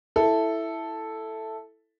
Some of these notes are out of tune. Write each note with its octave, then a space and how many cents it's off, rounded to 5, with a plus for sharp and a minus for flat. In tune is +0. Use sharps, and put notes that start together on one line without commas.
E4 +0 A4 +0